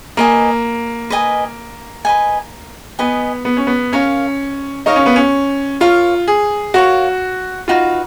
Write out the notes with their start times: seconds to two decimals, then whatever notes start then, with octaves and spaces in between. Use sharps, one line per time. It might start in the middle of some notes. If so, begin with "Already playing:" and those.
0.17 A#3 B4 D#5 G#5
1.10 B4 D#5 G#5
2.05 B4 D#5 G#5
2.99 B3 B4 D#5 G#5
3.45 B3
3.57 C#4
3.67 B3
3.93 C#4 A#4 C#5 F5
4.86 D#4 A#4 C#5 F5
4.96 C#4
5.06 B3
5.16 C#4
5.80 F4 A#4 C#5 F5
6.28 G#4
6.74 F#4 A#4 C#5 F5
7.68 D#4 F4 F#4 B4